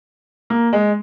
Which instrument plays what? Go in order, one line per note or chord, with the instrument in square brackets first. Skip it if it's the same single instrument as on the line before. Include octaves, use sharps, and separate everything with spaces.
[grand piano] A#3
G#3